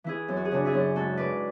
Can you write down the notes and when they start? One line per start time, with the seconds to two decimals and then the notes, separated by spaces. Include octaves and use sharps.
0.04 E3 E4 G#4
0.28 F#2
0.36 F#4
0.45 G#4
0.51 C#3 D4 F#4
0.65 E4 G#4
0.73 F#2
0.96 G#2 F#4 A4
1.17 G#2 B4 D5